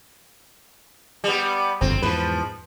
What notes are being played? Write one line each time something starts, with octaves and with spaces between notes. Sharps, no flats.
G3 B3
G1 F2 C4
E2 G#2 F3 B4